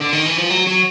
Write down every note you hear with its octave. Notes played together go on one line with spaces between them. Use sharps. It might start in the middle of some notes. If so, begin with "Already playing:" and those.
D3
D#3
E3
F3
F#3
F#3